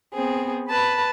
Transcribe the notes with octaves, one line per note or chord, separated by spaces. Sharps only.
B3 C4 G#4
B4 A5 B5